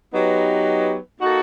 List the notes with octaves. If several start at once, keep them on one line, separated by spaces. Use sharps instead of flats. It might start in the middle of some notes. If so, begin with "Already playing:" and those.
F#3 B3 D#4 G4 B4
A#3 D#4 F#4 A4